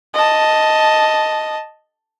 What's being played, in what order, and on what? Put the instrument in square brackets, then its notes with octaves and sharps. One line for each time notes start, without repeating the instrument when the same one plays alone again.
[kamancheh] D#5 A5